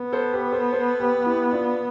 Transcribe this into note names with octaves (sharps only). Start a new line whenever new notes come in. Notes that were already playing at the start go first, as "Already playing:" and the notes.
Already playing: B3
A4 C5
G4 B4
A4 C5
A4 C5
G4 B4
E4 G4
D4 F4